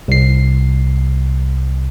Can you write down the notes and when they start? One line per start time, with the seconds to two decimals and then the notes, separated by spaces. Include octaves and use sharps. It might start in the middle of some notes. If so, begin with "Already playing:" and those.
0.08 C2 C7